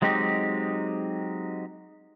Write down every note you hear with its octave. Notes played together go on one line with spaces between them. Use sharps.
F#3 G#3 C4 D#4 G4